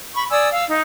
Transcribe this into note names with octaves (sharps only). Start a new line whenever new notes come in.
B5 C#6
D5 G#5 D#6 E6
F5 E6
D#4